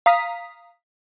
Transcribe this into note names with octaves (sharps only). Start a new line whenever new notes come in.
F5 A#5 D#6 B6